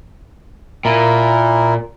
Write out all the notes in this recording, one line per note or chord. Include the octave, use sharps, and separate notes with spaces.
A#2 E4 A#4